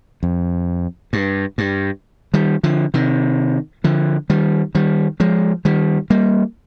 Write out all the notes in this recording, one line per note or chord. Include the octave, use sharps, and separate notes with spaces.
F2
G2
G2
D#3 G3
D3 F3
C3 D#3
D3 F3
D#3 G3
D#3 G3
F3 G#3
D#3 G3
G3 A#3